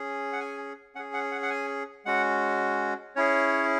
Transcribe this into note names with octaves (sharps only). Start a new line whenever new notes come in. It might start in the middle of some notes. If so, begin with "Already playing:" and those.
Already playing: C#4 G#4
F#5
G#5
C#4 G#4 F#5
F#5
F#5
F#5
G#5
G#3 C#4 F#4 F#5
C#4 E4 G#4 C#5